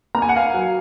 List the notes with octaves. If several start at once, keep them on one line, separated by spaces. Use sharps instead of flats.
A#3 A#5
G#5
F#5
F5 G#5
F#3